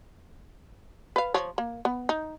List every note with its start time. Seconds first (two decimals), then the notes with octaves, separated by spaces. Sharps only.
1.16 B4 F5
1.34 F3 C#5
1.58 A#3
1.85 B3
2.09 D#4